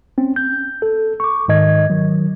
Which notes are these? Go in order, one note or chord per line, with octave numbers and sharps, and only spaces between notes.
C4 C#4
G6
A4
C#6 D6
G#2 D#3 D#5 G#6
D#3 F#3